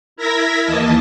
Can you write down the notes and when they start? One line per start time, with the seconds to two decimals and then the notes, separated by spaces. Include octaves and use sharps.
0.16 E4 A#4 E5 G#6 A#6 B6
0.65 D#2 E3 A#3 D#5 A5